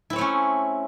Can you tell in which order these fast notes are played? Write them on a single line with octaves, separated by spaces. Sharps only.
E4 C4 C#5 A3 C#4